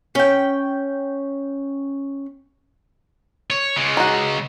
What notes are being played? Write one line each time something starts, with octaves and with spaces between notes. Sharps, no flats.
C#4 G5
C#5
C#3 G#3
D#4 F#4